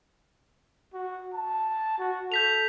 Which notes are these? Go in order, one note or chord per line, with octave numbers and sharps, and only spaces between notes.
F#4
A5
F#4
A4 G6 B6 F7